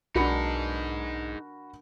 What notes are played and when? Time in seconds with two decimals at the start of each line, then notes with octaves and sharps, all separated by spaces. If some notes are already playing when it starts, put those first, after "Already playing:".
0.15 B1 D4 D#4 F#4 G#4 A#4 B5 C#7